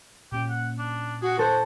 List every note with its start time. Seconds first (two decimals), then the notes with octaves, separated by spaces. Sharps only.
0.32 A#2 C#4 G4
0.49 F#5
0.78 D4
1.22 F#4 G#4
1.39 F#4 A4 C5